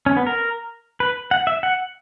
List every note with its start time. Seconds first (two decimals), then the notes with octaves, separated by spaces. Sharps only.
0.06 C#4
0.17 B3
0.27 A#4
1.00 B4
1.31 F#5
1.47 E5
1.63 F#5